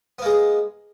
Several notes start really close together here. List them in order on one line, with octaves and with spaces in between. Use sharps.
B3 A#3 G#3